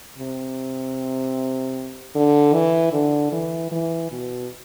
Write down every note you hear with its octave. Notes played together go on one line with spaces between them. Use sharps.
C3
D3
E3
D3
E3
E3
B2